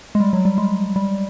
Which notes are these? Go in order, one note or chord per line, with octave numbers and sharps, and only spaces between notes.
G#3
G3
F#3
G3
G#3
G3